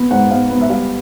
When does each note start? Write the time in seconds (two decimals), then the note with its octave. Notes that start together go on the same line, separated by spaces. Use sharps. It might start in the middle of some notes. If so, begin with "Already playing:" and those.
Already playing: B3
0.11 G#2 F#5
0.30 B3 F5
0.50 B3
0.61 E5
0.70 G3 F5